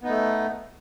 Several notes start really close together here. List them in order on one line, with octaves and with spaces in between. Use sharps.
B3 D#4 A3